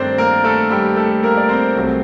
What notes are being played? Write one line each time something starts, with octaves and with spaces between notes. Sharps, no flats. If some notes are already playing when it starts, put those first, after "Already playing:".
Already playing: G2 D#3 A3 C4 D4 C5 D5
A#3 A#4
A3 A4
G3 G4
A3 A4
A#3 A#4
D5
C4 C5
C2 C3 F#3 A3